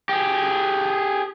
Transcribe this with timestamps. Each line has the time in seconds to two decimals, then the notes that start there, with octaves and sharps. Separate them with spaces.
0.09 G4 G#4